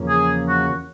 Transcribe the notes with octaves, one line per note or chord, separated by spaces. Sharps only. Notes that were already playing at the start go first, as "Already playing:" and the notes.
Already playing: E2 C#3 F3 A#3 C#4
G#4
F#4